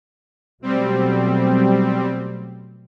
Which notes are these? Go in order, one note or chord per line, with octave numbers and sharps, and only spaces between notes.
B2 F#3 G3 A3 C4